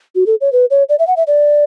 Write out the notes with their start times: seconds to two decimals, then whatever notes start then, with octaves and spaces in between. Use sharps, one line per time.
0.15 F#4
0.26 A4
0.41 C#5
0.52 B4
0.70 C#5
0.89 D5
0.99 E5
1.07 F#5
1.17 E5
1.27 D5